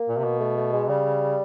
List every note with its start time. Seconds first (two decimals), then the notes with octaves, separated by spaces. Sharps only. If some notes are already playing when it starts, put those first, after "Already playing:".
Already playing: A#3
0.08 A#2
0.17 C3
0.24 B2
0.40 A3
0.57 A3
0.73 G#3
0.89 C#3 G3